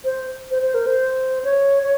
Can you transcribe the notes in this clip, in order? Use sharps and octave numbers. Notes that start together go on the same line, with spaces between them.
C5
C5
C5
A#4
C5
C#5
C#5